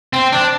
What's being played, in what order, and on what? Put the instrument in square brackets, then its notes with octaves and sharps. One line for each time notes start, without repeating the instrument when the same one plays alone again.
[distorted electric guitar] C4
D4